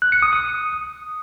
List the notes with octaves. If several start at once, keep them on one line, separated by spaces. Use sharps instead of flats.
F#6
C#7
D#6
D#6